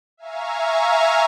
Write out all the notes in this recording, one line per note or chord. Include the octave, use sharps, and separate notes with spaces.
E5 F5 G#5 A#5 C#6